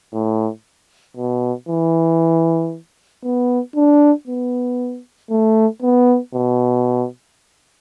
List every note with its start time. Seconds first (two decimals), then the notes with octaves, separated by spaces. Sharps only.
0.13 A2
1.17 B2
1.69 E3
3.24 B3
3.76 D4
4.27 B3
5.31 A3
5.82 B3
6.34 B2